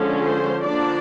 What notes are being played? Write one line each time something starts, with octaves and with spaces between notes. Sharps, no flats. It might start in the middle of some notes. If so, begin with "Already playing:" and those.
Already playing: D3 F3 G#3 C#4 A4
C5
D3 F3 A#3 D4 D5